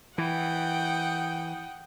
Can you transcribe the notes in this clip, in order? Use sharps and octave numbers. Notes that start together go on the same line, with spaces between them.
E3 F#5 G5 D#6